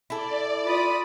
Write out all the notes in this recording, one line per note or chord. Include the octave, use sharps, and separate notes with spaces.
E4 A4 D5
F4 B4 B5 D#6